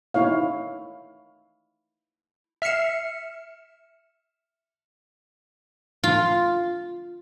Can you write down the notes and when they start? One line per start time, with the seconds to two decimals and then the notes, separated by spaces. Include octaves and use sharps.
0.14 D#4 E4 C#5 F5
2.62 E5 F6 C7 C#7 E7
6.04 F4